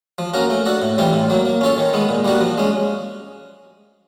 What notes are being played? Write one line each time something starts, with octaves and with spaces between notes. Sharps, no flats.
F3
A#3 C#4 F#4 A#4
A3
D4 F#4 A4
A2
E3 G3 C4 F4
A2
F#3 A#3
A#3
C#4 F4 A4 C#5
D#3
G#3 B3
A#2
G3 A#3 D4 F#4
F3
G#3 C#4